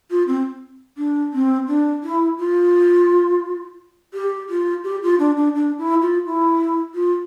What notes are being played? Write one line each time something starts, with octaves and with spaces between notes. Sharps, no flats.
F4
C4
D4
C4
D4
E4
F4
G4
F4
G4
F4
D4
D4
D4
E4
F4
E4
F4